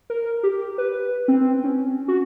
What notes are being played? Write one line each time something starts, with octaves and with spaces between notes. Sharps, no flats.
A#4
G4
B4
C4
C#4
F#4